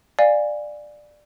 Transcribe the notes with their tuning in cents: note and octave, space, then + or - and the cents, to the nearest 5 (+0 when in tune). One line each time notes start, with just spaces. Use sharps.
D5 +15 F5 +0 G#5 -15